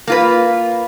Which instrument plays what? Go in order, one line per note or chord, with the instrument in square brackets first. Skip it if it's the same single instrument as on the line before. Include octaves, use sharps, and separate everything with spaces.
[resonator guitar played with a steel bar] A#3 F4 B4